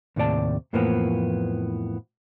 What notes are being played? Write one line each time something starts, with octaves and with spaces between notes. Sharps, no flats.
D#2 A2 C3 D5 A5
F2 A2 E3 F3 A#3 B3